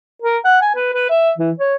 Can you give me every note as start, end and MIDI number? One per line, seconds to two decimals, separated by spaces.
0.22 0.38 70
0.45 0.60 78
0.62 0.73 80
0.75 0.93 71
0.93 1.07 71
1.10 1.31 76
1.38 1.52 52
1.59 1.76 73